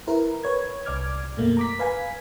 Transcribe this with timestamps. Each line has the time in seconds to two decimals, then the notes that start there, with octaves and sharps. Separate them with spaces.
0.07 E4 A#4 B4
0.44 B4 C#5 G#6
0.85 C2 D5 D6 F6 G#6
1.37 F#2 B2 A3 A#3
1.57 A#5 D6 B6
1.79 B4 F5 G#5 G#6 B6